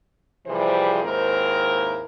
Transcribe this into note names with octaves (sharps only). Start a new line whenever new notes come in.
C3 E3 F3 G3 G#4 C5
D#2 G#2 C4 E4 A#4